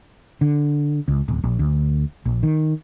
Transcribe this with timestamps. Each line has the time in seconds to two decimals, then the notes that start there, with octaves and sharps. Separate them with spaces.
0.41 D3
1.08 C#2
1.28 D1
1.44 A#1
1.59 D2
2.26 A#1
2.43 D#3